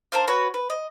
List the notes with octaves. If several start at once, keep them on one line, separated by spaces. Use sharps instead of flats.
D4 A#4 C5 F5
F#4 B4 C#5
B4
D#5